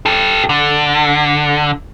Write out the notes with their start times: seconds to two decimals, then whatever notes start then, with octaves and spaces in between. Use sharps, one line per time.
0.06 G4 A4
0.49 D3